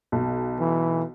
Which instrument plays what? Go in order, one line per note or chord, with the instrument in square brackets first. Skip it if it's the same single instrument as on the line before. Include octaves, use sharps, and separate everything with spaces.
[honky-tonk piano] B1
[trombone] E3